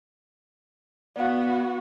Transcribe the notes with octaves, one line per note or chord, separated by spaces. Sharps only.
B3 F#4 D5 F5